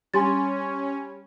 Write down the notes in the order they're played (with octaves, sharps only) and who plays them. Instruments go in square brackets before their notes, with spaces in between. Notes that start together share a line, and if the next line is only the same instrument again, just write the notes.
[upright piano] G3 [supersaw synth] C#4 [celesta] G#5 C6 A6